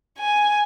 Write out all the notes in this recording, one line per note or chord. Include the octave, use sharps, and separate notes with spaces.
G#5